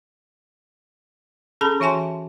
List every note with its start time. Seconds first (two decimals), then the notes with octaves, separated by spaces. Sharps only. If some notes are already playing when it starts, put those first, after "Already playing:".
1.61 C#4 G#4 A4 A5 B5
1.80 E3 F#4 E5 G#5 A5 C6